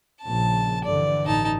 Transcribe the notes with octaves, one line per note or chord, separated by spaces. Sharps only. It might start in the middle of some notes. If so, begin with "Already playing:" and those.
A#1 C#3 A5
G2 D3 E3 D5
A1 D#4 A5